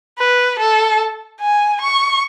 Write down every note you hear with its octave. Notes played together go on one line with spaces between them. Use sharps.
B4
A4
G#5
C#6